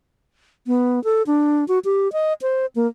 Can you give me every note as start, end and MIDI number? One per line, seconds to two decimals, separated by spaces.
0.67 1.02 59
1.04 1.23 69
1.27 1.67 62
1.68 1.79 66
1.85 2.11 67
2.13 2.33 75
2.42 2.66 72
2.76 2.87 58